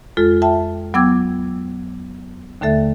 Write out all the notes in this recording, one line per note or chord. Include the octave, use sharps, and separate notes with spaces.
F2 G#3 F4 A4
E5 G5 A5
F#3 B3 G5 D6 E6 G#6
D#2 D3 A3 A4 E5